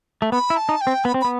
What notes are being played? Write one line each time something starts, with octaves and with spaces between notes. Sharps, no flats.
A3
B3 B5
E4
A5
D#4
G5
C4
B3 B5
C4
B5
B3